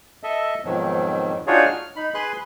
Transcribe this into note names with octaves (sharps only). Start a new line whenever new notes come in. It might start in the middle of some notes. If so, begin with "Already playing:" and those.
A4 D#5 E5
F2 G#2 B2 D#3 F#3
D4 D#4 F4 F#4 G#4 C#5
F6
D#4 B5
G#4 B4 B5 C6 F#6